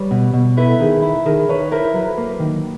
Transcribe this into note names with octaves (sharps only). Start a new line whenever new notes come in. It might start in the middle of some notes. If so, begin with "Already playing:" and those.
Already playing: G3 B4 C#5
B2
B2
E4 A4 B4
D#3 G#4 A#4
E4
D#3 G#4 A#4
D#3 B4 C#5
E4 A#4 C5
F#3 A4 B4
A#3
D#3